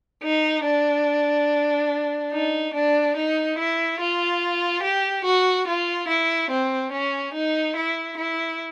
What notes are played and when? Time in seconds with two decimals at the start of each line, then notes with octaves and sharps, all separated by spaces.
0.23 D#4
0.66 D4
2.32 D#4
2.74 D4
3.17 D#4
3.58 E4
4.00 F4
4.83 G4
5.25 F#4
5.68 F4
6.08 E4
6.50 C4
6.92 C#4
7.34 D#4
7.76 E4
8.17 E4